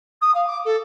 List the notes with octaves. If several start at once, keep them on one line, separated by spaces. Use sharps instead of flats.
D#6
F5
D6
A4